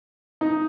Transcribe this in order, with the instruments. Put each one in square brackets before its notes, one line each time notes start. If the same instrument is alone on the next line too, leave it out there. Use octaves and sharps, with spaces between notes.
[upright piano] D#4